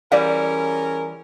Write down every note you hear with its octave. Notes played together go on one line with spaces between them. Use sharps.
E3 G3 C#4 G#4 A#4 D5 F5